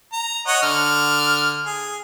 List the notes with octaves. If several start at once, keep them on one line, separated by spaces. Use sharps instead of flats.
A#5
C#5 D#5 F#5
D3 F6
G#4